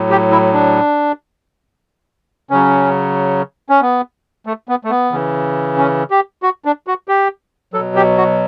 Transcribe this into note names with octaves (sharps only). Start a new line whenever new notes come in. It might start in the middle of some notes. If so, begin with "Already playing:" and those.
Already playing: A2 F#3
G4
E4
D4
C#3 F#3 C#4
C#4
B3
A3
B3
A3
B3
C#3 E3
C#4
G4
F#4
D4
F#4
G4
F#3 A4
B2
G4
F#4